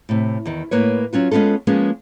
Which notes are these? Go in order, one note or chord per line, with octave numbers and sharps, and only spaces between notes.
A2 C3
E2 D#3
A2 A#3 B4 C#5
F#3 C#4 F4 F#4
G#3 B3 C#4 F4 A4
F3 G#3 A#3 B3 C#4